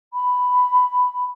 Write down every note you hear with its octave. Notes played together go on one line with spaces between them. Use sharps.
B5